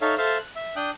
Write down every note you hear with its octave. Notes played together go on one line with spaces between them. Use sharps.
D#4 A4 C#5 E5 F5
A4 C5 E5 F5 A5
F#6
E5
D4 G5 D#6 F#6